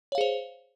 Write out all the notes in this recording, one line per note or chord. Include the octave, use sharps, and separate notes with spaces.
G#4 C5 C#5 F5